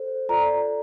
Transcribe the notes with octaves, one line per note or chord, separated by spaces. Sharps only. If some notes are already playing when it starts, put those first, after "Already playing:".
Already playing: A4 C5
F4 A4 D5 A#5